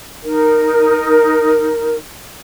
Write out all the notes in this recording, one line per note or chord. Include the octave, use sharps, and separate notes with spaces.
D#4 A#4